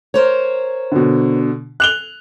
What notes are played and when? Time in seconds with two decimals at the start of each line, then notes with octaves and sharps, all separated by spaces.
0.14 A#4 C5 C#5
0.92 B2 D3
1.80 F#6 F7 G7